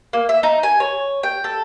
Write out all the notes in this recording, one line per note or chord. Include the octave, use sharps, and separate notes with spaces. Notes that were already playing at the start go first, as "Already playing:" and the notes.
A#3
E5
D#4
G#5
C#5
G5
A4